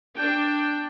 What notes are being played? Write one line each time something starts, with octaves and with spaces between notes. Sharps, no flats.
D4 G5